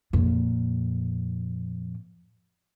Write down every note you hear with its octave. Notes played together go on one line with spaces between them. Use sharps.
F2 A#2